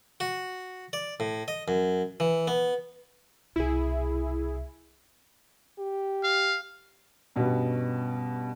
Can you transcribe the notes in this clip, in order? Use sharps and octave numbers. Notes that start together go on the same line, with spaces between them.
F#4
D5
A2
D#5
F#2
E3
B3
C2 B2 E4 G#4
G4
F5
G2 B2 G3 B3 C#4